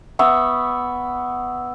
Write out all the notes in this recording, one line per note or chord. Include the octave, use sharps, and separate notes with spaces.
B3 E5 C#6